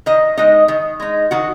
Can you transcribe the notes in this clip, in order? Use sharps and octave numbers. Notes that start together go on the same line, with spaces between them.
D#3 D#5
G#3 D#4 D#5
D#3
G#3 D#4
D#3 F#4